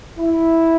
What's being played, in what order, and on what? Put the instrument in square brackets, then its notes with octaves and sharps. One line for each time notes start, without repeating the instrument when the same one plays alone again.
[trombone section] E4